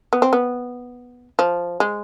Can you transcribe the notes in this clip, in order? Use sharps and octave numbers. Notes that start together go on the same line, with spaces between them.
B3
C4
B3
F3
G#3